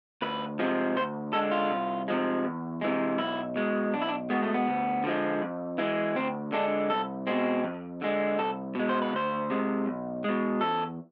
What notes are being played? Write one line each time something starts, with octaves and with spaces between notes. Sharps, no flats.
D2 B4
C3 F3 G#3
D2 C5
D3 G#3 A4
F4
C2
C3 F3 G#3
E2
C3 E3 G#3
B1 E4
B2 G#3
B1 D4
E4
D4
B2 G#3 B3
A3
B3
D2
D3 F3 G#3
F2
E3 G#3
D2 C4
D3 G#3 D4
C2 A4
B2 G#3 C4
F2
D3 G#3
C2 A4
B2 G#3
C5
B4
D2 C5
C3 G#3
B1
B2 G#3
E2 A4